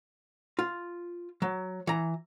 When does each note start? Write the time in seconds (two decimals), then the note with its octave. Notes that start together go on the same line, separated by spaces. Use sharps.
0.59 F4
1.42 F#3
1.87 E3 A#5